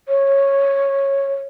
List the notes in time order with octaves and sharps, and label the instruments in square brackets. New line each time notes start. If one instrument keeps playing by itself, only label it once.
[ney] C#5